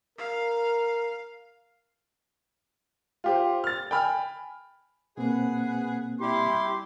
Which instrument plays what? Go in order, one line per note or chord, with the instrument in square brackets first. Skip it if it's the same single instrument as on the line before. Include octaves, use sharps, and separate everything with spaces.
[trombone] A#4 [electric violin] F5
[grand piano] F4 G4 C5
F6 A6
G5 G#5 B5 F6
[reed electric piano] B2 A#3 C4 [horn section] G#4 B4 F#5
[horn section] G3 C6 [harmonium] E4 G4